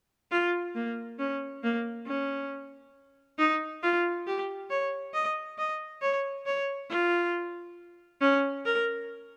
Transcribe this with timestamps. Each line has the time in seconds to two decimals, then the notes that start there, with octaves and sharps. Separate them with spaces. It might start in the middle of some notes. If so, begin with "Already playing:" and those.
0.31 F4
0.75 A#3
1.19 C#4
1.63 A#3
2.07 C#4
3.39 D#4
3.83 F4
4.27 G4
4.70 C#5
5.14 D#5
5.58 D#5
6.02 C#5
6.46 C#5
6.90 F4
8.22 C#4
8.65 A#4